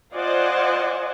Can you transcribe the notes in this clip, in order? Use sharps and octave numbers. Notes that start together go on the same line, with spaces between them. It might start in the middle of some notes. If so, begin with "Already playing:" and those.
F4 C5 D5 D#5 F#5 G#5